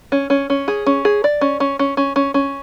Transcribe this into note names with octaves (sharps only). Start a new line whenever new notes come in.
C#4
C#4
C#4
G#4
C#4
G#4
D5
C#4
C#4
C#4
C#4
C#4
C#4